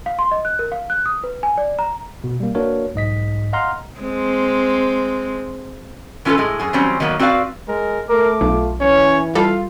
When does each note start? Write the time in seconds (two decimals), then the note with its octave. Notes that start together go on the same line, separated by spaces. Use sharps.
0.06 F5
0.19 C6
0.31 D#5
0.45 F#6
0.59 A#4
0.72 F5
0.90 F#6
1.06 D#6
1.24 B4
1.43 G#5
1.58 D5
1.79 A#5
2.24 B2
2.40 G3 A#3
2.55 A#3 D4 F#4 A#4 B4 C#5
2.94 B1 G#2 D#5 B6
3.53 D#5 F5 F#5 A#5 C6 F6
4.00 G#3 C4
6.25 E3 C#4 F4 G#4 A4 B4
6.38 A2 G#3
6.59 F#2 G#4
6.73 E3 F#3 G3 C4 C#4
7.00 D#3 F#3 A#3 B3
7.19 C4 F#4 B4 D5 F5
7.68 G#3 A#4
8.09 A3 A#4 D6
8.41 B1 F4
8.80 E3 C#4 C#5
9.35 G3 F4 A4 F5